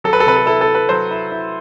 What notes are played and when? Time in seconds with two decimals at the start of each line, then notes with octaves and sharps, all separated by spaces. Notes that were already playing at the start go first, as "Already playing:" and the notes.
0.04 F#3 A4
0.13 B4
0.20 A4
0.26 C3 B4
0.36 A4
0.46 E4 A4
0.61 A4
0.68 E4
0.75 B4
0.89 F#3 C5
1.11 E4
1.32 E4